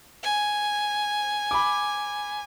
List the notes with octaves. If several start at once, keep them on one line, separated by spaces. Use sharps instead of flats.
G#5
B5 D6